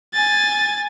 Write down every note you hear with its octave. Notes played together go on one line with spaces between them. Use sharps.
G#5 A6